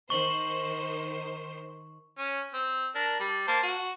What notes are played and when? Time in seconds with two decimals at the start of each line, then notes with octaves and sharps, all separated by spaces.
0.10 D#3 C5 C#6 F#7
2.18 C#4
2.54 C4
2.95 D4 A#4
3.20 G3
3.47 A#3 C5 A5
3.63 F#4